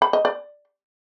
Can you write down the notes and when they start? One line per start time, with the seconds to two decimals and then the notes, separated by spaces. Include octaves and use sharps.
0.02 B5
0.13 D#5
0.25 D5